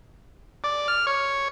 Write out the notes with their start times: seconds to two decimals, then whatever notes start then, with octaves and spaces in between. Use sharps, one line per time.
0.64 D5
0.88 F6
1.07 C#5